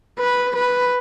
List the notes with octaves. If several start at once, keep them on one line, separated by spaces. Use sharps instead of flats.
B4
B4